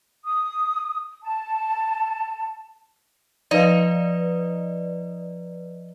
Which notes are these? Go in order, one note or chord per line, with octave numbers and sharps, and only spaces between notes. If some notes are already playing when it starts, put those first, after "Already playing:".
D#6
A5
F3 D#4 B4 D5 F5